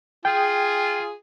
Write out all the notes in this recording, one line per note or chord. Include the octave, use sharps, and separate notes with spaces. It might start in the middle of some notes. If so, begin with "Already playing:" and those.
F4 G#4 G5